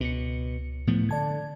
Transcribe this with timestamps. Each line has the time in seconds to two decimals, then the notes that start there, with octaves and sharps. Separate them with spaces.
0.01 C#2 B2 C#7
0.87 A2 F3 B3
1.09 D3 D5 A5 G#6